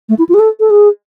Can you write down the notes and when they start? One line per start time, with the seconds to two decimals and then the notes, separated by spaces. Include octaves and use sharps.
0.09 A3
0.18 E4
0.29 F4
0.34 G#4
0.39 A4
0.60 A4
0.70 G#4